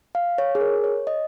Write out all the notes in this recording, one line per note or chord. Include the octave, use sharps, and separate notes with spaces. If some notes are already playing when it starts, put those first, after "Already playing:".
F5
C#5
G#4
A#4
C#5
D#5